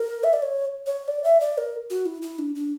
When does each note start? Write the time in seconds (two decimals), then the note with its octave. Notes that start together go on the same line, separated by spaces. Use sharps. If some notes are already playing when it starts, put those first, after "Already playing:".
Already playing: A#4
0.24 E5
0.33 D5
0.42 C#5
0.87 C#5
1.08 D5
1.24 E5
1.40 D5
1.58 A#4
1.90 F#4
2.06 E4
2.22 E4
2.39 D4
2.55 D4